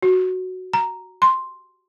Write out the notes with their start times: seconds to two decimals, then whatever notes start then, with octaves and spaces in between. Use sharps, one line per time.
0.02 F#4
0.73 A#5
1.22 C6